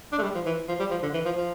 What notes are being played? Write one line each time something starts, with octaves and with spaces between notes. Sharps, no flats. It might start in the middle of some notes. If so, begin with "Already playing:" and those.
D4
A3
G3
F3
E3
F3
G3
F3
D3
E3
F3
F3